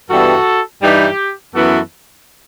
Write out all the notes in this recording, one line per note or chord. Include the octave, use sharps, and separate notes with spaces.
G2 E3 G3 B3 F#4 A4
G2 E3 G3 D#4 G4
F#2 E3 B3 E4 F#4 A4